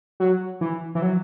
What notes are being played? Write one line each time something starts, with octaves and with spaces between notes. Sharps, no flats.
F#3
E3
E3
F#3